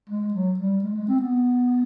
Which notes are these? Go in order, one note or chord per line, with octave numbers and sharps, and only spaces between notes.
G#3
F#3
G3
G#3
G#3
C4
B3